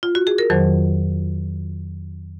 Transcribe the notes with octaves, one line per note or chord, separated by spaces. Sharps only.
F4
F#4
G#4
A#4
F2 D#3 F#3 C5